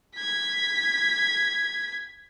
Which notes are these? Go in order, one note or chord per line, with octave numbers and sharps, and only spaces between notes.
G#6 B6